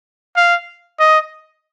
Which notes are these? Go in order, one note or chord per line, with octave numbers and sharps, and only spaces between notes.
F5
D#5